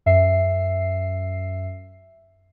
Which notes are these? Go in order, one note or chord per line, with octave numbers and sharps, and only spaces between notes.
F#2 E5 C7